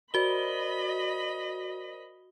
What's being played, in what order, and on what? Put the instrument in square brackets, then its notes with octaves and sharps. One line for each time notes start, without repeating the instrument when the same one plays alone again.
[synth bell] F#4 G7 [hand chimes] A#4 C5 D5 [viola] D#5 B5